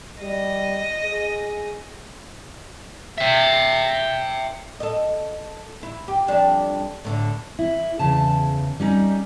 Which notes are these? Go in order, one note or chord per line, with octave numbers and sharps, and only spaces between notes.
G3 D#5
G#4
E5 G5
A4 D#5
E4
G4
F2 G3 D4
A2 D3
E4
E2 C#3 A5
G3 C#4 D#4